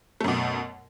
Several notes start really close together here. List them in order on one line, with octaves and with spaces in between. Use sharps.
A3 F#2 B2